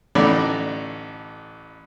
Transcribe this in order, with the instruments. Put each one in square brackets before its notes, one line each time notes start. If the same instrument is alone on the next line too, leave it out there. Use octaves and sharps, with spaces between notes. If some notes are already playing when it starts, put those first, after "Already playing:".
[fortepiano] A1 A2 D3 D#4 D5 B5